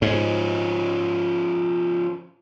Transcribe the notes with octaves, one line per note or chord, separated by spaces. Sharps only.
G#2 F3 C#4